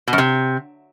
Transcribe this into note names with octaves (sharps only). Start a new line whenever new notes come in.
B2
F#2
C3